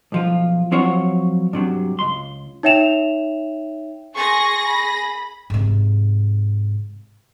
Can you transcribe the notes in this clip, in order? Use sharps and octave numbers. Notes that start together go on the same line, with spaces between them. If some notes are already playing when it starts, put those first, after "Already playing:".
B1 F3 F4
F3 F#3 C4 F4 C#5 F#5
G2 C3 F#3
C#2 C6
D#4 C#5 E5 G5 E7 F7
G#4 C6 C#6 A#6
B5
G#2 C3